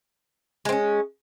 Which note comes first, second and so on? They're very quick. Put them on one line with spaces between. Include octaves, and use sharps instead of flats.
G#3 C4 C#4